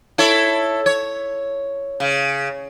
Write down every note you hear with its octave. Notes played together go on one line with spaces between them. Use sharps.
E4 A4 C#5
C#5
C#3